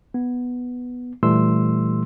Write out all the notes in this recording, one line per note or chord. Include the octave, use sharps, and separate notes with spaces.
B3
A#2 E3 G3 A3 C6 E6